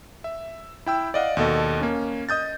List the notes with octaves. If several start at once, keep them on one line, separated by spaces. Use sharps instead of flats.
E5
E4 G5 E6
D5 D#5 F5 F#5
D#2 B2 A4 D#5
A#3 C#4
D#5 D#6 G6 A6